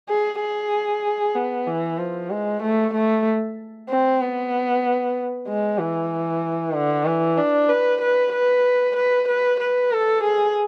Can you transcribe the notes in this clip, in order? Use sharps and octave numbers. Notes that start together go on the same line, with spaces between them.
G#4
G#4
B3
E3
F3
G#3
A3
A3
C4
B3
G#3
E3
D3
E3
D4
B4
B4
B4
B4
B4
B4
A4
G#4